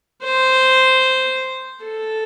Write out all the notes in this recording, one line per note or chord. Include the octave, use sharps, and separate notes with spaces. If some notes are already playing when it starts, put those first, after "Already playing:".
C5
A4